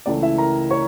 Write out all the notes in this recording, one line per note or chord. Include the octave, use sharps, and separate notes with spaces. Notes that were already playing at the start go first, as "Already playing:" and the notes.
C#2 C#3 E3 A3 D5
E4 E5
A#4 A#5
C#5 C#6